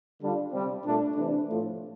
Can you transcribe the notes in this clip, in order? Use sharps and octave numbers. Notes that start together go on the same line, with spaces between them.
D3 G3 D4 F4
C3 G3 C4
A#2 A3 D4
C3 E3 A3 D4
A2 F3 A3